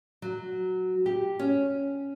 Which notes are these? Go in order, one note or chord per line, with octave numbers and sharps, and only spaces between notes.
F#3
G4
C#4